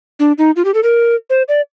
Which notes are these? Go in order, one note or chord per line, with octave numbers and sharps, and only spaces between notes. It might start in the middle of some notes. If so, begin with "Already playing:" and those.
D4
D#4
F4
G4
A4
A#4
C5
D5